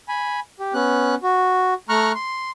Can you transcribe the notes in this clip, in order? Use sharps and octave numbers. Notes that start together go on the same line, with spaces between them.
G#5 B5
G4
B3 C#4 F#6
F#4
A3 A#5 C#6 F6 F#6
C6